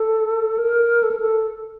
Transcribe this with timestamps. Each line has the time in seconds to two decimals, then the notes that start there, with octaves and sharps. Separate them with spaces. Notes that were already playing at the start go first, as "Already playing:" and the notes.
Already playing: A4
0.58 A#4
1.03 A4
1.11 A#4
1.20 A4